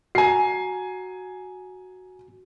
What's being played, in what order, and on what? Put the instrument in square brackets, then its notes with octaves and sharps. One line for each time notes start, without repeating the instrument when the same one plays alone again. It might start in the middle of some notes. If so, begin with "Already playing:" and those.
[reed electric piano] F#4 A#5 [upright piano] G#5 C7